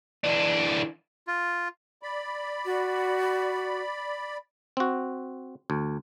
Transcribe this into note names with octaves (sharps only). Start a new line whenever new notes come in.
E3 D4
F4
D5 B5
F#4
C4 F#4
D2